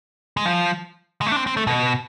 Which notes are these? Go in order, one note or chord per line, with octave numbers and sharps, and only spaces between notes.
G#3
F3
G#3
A3
D4
C4
C4
A3
B2